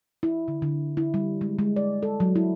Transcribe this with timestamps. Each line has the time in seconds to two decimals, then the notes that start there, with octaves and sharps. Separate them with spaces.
0.23 E4
0.48 D3
0.62 D3
0.97 E4
1.14 G3
1.41 G#3
1.59 G#3
1.76 D5
2.03 A4
2.20 F#3
2.36 E4